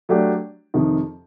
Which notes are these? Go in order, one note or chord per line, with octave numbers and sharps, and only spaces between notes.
F#3 A3 D4 G4
F2 C3 D#3